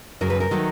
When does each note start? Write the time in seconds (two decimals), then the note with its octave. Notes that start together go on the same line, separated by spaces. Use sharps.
0.21 F#2 C#3 F#3 A#4
0.30 B4
0.40 A#4
0.51 D#3 F#3 A3